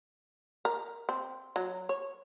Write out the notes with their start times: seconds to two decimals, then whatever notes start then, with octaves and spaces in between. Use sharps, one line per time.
0.65 A#4
1.09 C4
1.56 F#3
1.89 C#5